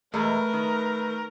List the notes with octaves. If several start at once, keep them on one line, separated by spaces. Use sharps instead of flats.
E2 B2 G#3 A3 A#4 B4
D#3